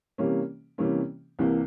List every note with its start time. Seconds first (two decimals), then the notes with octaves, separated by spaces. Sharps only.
0.18 C3 E3 G3 A#3 C#4
0.78 C3 E3 G3 A#3 C#4
1.39 C2 C3 E3 A#3